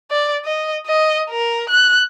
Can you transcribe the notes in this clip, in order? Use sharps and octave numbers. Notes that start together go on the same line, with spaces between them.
D5
D#5
D#5
A#4
F#6